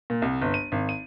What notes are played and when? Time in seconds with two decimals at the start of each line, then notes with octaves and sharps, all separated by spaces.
0.10 A#2
0.22 C2
0.42 G1
0.54 D#7
0.72 G#1
0.89 D#7